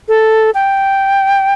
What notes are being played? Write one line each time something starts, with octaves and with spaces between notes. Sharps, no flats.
A4
G5